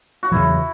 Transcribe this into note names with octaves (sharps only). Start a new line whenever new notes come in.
F#4
E2 C#3 F#3 E4